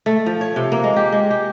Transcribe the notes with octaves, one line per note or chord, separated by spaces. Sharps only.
A3
F3
C#5
C3
A#3
G#3
G4
G#3
G4